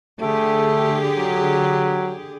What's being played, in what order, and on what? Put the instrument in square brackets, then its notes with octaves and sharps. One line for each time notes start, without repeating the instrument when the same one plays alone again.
[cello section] D3 G4 G#4 [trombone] A3
[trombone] F#3